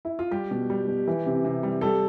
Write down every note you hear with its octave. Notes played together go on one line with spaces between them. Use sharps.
E4
F4
G3 G4
B2
G3
B2
E3
C3
C3
G3
G3 A4